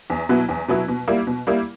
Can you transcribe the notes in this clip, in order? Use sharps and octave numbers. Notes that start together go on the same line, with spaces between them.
E2
B2 F#3 B3 E4
E2
B2 F#3 B3 E4
B2
G3 A#3 E4
B2
G3 A#3 E4